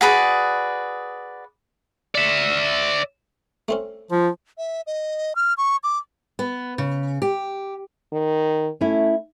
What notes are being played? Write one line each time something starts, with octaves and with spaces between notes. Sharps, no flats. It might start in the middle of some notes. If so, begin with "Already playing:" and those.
F#4 G#4 B4 D5
D5 E5
A3 C4 C#4
F3 F4
E5
D#5
F6
C#6
D6
B3
C#3
G4
D#3
A3 C#4 E4